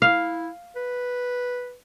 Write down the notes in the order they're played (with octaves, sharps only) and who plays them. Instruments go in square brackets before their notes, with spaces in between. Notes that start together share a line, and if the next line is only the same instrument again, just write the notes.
[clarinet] E4 [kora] F5
[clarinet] B4